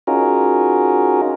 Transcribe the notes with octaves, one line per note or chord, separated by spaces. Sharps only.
C#4 D#4 F4 F#4 G#4 A#4